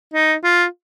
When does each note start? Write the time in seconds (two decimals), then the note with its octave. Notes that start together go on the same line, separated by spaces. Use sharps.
0.14 D#4
0.44 F4